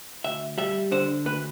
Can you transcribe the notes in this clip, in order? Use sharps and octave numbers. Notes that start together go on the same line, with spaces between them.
D2 E5
G3 E5
D3 C5
D2 B4